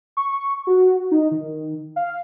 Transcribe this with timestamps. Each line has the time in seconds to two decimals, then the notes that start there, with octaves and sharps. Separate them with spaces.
0.17 C#6
0.67 F#4
1.11 D#4
1.31 D#3
1.96 F5